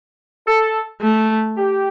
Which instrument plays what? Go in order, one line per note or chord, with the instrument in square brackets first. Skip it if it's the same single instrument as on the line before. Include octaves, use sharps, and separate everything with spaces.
[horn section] A4
[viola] A3
[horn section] G4